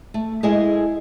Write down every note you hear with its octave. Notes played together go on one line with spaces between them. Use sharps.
A3
G#3 E4 G#4 A4 D#5 G#5